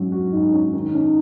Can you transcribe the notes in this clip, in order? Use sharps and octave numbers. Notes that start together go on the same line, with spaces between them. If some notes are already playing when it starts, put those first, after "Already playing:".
Already playing: G#2 F#3 C#4
F#4
G#2 D#4
C#4
D#3 D#4
C#4